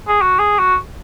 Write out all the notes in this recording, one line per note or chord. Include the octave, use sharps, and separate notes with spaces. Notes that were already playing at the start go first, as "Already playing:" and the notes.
G#4
F#4
G#4
F#4